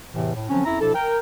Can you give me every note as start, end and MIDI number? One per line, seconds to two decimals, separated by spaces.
0.14 0.31 40
0.14 0.31 45
0.14 0.31 48
0.14 0.31 52
0.35 0.49 45
0.49 0.64 50
0.49 0.64 53
0.49 0.64 54
0.49 0.64 60
0.49 0.64 61
0.65 0.79 41
0.65 0.79 61
0.65 0.79 64
0.65 0.79 76
0.65 0.79 82
0.81 0.93 47
0.81 0.93 53
0.81 0.93 62
0.81 0.93 64
0.81 0.93 69
0.95 1.18 70
0.95 1.18 79